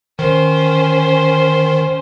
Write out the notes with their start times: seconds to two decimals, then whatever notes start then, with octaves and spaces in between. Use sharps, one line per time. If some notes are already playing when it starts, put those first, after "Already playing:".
0.19 D#3 C#4 C5